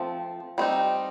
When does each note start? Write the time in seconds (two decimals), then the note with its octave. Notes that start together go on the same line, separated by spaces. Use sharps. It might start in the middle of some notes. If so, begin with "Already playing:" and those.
Already playing: F3 A3 C4
0.58 G3 C4 D#4